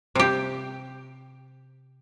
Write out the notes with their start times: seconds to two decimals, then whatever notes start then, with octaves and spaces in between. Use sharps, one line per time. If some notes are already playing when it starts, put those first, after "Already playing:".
0.15 C3 G4